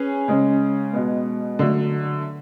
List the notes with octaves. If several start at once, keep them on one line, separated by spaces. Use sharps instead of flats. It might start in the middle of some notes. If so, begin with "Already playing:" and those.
Already playing: C#4 G#4 B4
C#3 G#3 C#4
B2 G#3 B3
D3 F#3 A3